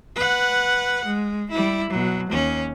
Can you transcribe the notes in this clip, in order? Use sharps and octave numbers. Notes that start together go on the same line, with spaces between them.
B4 F#5
G#3
G3 E4
B2 F#3
D#2 C#4